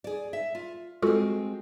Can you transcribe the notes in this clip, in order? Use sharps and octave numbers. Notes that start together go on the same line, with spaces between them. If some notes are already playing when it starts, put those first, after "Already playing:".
G#4 D5
E5
F4
G#3 C4 F4 F#4 A4